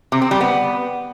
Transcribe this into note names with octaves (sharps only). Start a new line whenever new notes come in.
C3
C4
G3
B3